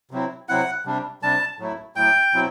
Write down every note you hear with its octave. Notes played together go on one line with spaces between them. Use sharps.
C3 F#3 C4 E4
C3 F#3 C4 E4 F#5
C3 G3 D4
C3 G3 D4 A5
A2 F#3 A3 E4
A2 F#3 A3 E4 G5
B2 F#3 C4 E4